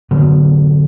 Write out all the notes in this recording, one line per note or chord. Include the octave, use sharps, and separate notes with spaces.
F#2 D3 F#3 B3